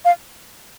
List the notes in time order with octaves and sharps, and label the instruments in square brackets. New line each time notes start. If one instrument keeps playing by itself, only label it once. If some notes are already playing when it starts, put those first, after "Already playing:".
[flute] F5